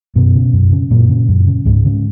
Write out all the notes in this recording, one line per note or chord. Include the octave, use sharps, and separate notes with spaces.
F#2 B2 B3
C#3
F#2
C#3
F#2 A#2 A#3
C#3
F#2
C#3
C#2 G#2 G#3
C#3